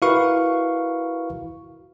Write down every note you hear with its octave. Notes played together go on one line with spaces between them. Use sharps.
E4 F#4 A#4 B4 F5 C#6